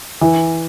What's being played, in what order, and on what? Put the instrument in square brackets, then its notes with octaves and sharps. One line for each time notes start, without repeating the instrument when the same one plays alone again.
[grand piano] E3